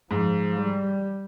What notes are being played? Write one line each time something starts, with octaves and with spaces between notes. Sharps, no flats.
G#2 F3
G3